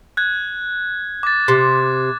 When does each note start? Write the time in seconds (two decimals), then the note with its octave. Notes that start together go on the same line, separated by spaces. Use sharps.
0.17 F#6 G#6
1.23 D6 A6
1.48 C3